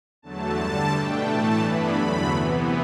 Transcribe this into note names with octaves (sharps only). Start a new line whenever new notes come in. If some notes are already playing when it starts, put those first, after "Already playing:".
E2 D3 F#3 A3 A5
G2 D3 G3
B2 A3 D4 G5
A2 E3 A3 A5
G2 E3 B3 D4 B5
E2 D3 F#3 A3
C3 E3 B3